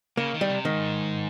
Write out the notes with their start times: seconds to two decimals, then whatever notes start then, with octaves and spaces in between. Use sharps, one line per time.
0.17 C#3 A#3
0.34 D#3
0.41 G3
0.50 C3
0.65 G#2 D#3